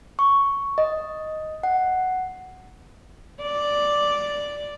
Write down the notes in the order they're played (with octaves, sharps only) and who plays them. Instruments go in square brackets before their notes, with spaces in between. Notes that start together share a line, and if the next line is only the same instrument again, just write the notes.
[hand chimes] C#6
D#5
F#5
[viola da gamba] D5